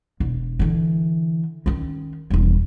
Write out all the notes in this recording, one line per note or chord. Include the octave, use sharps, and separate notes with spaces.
E1
D3 E3
D#3 C#4
E1 G3